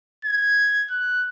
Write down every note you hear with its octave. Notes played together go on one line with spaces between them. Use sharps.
G#6
F#6